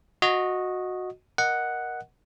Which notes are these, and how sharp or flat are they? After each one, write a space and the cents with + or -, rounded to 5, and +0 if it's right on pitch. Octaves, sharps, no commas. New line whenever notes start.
F#4 -15 D#5 +0
A#4 +15 D#5 +0 F#5 +0